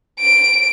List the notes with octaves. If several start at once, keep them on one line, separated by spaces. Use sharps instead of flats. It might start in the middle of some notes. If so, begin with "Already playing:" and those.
D7